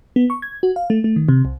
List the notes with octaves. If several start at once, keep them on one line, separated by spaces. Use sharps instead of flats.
B3
C#6
G#6
F#4
F5
A3
A3
D#3
C3
C2